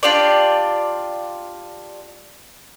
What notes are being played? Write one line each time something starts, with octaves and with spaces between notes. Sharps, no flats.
D4 F4 G4 D5